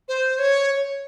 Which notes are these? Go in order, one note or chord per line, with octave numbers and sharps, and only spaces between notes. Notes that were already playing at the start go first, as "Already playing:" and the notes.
C5
C#5